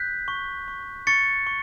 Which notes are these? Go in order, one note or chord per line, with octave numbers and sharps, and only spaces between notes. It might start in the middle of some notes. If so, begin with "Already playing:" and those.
Already playing: F#6 G6 B6
C#6
C#6
C#6 A6 C#7
C#6